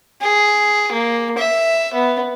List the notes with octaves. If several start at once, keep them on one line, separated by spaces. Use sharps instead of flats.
G#4
A#3
E5
B3